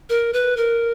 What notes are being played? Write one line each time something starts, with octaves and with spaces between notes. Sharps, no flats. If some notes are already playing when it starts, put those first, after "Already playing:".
A#4
B4
A#4